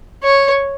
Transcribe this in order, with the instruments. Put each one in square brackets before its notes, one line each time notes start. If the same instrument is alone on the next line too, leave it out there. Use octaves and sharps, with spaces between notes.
[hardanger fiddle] C#5